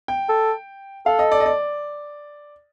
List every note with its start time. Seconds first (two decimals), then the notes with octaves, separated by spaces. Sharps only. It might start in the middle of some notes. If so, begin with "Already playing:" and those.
0.08 G5
0.29 A4
1.06 A4 F5
1.19 D#5
1.32 D5
1.40 D#5
1.46 D5